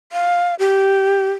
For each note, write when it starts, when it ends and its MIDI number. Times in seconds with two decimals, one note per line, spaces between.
0.12 0.55 77
0.59 1.31 67